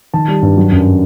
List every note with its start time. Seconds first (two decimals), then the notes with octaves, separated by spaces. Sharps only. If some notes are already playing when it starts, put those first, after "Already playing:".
0.14 D#3 A5
0.28 G3
0.42 G2
0.57 F#3
0.72 F#2